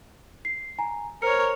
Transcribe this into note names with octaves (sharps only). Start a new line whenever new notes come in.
C7
G#5 A#5
A#4 C5 C#5 F6 C#7